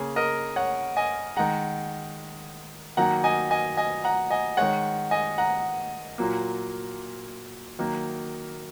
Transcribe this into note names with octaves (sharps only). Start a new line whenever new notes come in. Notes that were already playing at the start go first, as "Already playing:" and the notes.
Already playing: C#3 A#3 G#4 C#5
A#4 D#5
C#5 F#5
D#5 G#5
D#3 G#3 F#5 A#5
D#3 F#3 A#3 F#5 A#5
D#5 G#5
D#5 G#5
D#5 G#5
F#5 A#5
D#5 G#5
D#3 G#3 C#5 F#5
D#5 G#5
F#5 A#5
A#2 F#3 A#3
D#3 F#3 A#3